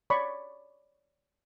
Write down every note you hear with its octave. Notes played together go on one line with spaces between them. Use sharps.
C#5 D5 B5 C#6